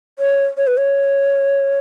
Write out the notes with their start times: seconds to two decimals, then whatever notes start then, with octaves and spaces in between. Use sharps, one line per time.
0.19 C#5
0.57 C#5
0.67 B4
0.77 C#5